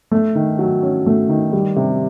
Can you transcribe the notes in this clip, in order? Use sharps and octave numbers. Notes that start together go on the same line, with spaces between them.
A3
D#3
F#3
C#4
A3
D#3
G3
C3